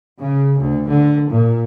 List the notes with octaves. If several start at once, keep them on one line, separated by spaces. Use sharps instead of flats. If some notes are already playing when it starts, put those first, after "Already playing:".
C#3
D2
D3
A#2